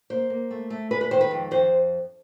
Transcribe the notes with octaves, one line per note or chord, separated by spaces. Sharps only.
A#3 C5
A#3
A3
A3
G#3 B4
B4
D#3 C5
B4
F2
F2 C5